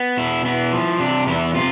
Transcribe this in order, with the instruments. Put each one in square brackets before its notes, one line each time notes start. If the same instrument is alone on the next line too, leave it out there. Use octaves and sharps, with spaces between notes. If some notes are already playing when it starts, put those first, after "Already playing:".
Already playing: [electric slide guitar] B3
B2 E4
B3 E4
F3
C3 D4
E2 E4
C3 F4